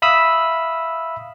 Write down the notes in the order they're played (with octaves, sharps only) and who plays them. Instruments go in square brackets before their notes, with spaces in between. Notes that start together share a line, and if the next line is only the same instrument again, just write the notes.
[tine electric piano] E5 F5 B5 D#6 E6